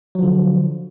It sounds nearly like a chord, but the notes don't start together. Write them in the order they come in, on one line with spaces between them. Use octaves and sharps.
F#3 F3 D3